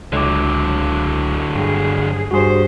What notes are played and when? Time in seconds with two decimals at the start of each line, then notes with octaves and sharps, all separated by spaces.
0.12 C#2 D3 F#3 D6
1.55 G2 G#4
2.31 G2 F#4 G#4 C5